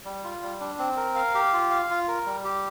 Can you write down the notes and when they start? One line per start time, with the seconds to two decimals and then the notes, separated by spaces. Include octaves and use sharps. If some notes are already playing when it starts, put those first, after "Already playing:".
0.05 G3
0.24 F4
0.42 G3
0.60 D4
0.79 C4
0.97 A#4
1.16 F5
1.35 G4
1.53 F4
1.71 F5
1.90 F4
2.08 A#4
2.26 G3
2.44 G4